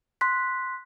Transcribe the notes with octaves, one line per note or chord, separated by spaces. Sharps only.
C6 F#6 B6